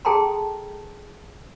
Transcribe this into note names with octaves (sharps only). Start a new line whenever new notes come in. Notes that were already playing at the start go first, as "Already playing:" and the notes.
G#4 A4 G5 A5 A#5 C6